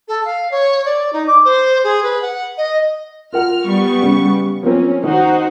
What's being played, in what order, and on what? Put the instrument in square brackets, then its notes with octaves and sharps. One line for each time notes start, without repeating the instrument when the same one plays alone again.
[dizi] A4
F5
C#5
D5
D#4
D6
C5
G#4
B4
F#5
D#5
[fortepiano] F4 A#4 F#5 [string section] F6
[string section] G3 B3 C#6
[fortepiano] C#3
[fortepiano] F3 A#3 C4 [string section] C#4
[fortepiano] D#3 [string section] D#4 F#4 C5